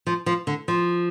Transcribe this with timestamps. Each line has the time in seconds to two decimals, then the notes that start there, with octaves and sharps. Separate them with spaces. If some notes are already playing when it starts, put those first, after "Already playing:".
0.07 F3
0.26 F3
0.47 D3
0.68 F3